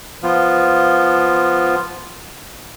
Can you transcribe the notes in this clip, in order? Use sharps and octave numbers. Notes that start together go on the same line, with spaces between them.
F3 B3 F4